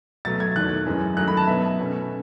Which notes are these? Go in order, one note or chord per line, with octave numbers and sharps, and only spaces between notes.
B2 F#3 A3 A6
G#6
E2 D#3 A3 F#6
F#2 E3 G#3 C#4
D#3 F#3 A3 D#4 F#6
B5
A5
B2 F#3 B3 D#4 E5
B2 A3 C#4